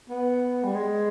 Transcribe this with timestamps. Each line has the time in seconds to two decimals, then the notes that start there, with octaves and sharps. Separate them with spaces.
0.09 B3
0.64 G3
0.74 G#3